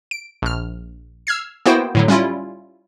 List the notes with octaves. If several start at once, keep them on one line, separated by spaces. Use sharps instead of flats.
D7
A#1 F6
E6 F6 G#6 C7
A#3 B3 E4 F#4 C5 G5
A2 D3 F#3
G3 C#4 E4 F4